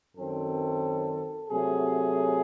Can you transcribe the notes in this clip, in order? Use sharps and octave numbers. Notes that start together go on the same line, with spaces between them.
F#2 D#3 F#3 C4 A4
C3 F#3 A3 G#4